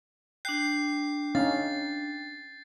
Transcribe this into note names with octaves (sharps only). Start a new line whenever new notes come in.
D4 G5 F#6 G6 C7
C#4 D#4 F5 A6